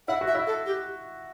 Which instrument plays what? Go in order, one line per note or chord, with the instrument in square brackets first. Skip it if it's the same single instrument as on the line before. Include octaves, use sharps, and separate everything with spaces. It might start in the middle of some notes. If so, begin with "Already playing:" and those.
[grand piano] E4 [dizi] F#5
[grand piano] F#4
[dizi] E5
[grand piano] E4
[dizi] A4
G4